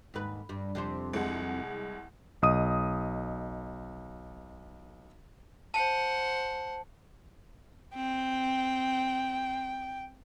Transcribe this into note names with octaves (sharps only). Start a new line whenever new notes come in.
D#2 G#2 B4
G2
F2 C3 C5
C2 G#3 F#5
B1 D#5 D#6 D#7
C5 F#5 A5
C4 G5